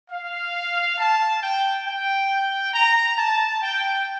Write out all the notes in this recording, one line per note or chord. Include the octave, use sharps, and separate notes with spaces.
F5
A5
G5
G5
A#5
A5
G5